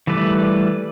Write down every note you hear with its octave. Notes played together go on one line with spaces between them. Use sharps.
E3 G3 A3 B4 D5